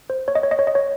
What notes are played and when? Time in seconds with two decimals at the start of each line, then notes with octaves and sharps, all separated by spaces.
0.10 C5
0.28 C#5
0.35 D#5
0.43 C#5
0.51 D#5
0.59 C#5
0.67 D#5
0.75 C#5